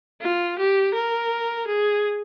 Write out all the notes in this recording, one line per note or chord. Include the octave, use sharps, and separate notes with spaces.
F4
G4
A#4
G#4